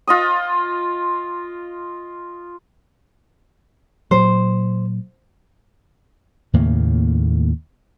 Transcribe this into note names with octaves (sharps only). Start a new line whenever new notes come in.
F4 D#5 D#6
A#2 F#3 C5
D#2 A2 C#3 A#3